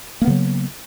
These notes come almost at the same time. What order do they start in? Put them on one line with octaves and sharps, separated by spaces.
A#3 B3 C#3 F#3